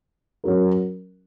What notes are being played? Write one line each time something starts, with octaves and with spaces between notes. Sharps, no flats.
F#3 C#4 F#4 A#4